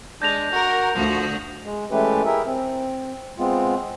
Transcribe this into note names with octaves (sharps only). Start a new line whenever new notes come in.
G#3 D4 G6 A#6 F7
F#4 A#4
D2 F3 F#4
G#3
E3 G#3 A3 C#4 G4 B4
E4 G4 G#4 A#4 E5
C4
G#3 B3 C4 F4